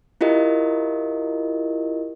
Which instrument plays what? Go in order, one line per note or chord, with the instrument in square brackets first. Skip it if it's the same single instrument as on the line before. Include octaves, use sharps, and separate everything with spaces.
[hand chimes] E4 F4 G4 A#4 D#5